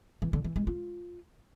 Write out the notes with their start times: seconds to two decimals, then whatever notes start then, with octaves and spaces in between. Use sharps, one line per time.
0.22 E3
0.33 D3
0.44 E3
0.56 G#3
0.67 F4